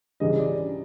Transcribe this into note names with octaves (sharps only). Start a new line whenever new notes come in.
C#2 C#3 E3 G3 D#5
D5